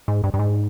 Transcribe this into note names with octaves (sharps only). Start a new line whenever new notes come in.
G#2
G2
G2
G#2